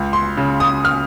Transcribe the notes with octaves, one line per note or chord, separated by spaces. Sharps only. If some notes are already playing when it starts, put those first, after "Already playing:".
Already playing: C#2
C6
C#3
D#6
F6